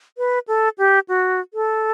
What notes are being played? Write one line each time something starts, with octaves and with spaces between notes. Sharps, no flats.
B4
A4
G4
F#4
A4